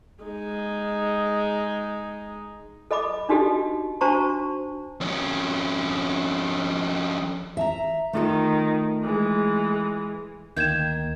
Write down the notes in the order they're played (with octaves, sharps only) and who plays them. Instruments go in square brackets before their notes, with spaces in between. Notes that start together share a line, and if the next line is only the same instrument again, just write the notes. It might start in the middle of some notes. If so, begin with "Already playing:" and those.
[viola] G#3 D#4
[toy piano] A4 D#5 B5 D6
D4 D#4 F#4 G4 A4 D#5
D4 F#4 C5 A5 A#5 C#6
[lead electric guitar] F2 C#4
[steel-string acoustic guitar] E5 A5 A#5
[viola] D#3 [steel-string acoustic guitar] A3 F4 A4
[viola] E3 G#3
[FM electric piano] D2 A#3 [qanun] D#3 G5 [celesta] G6 G#6 E7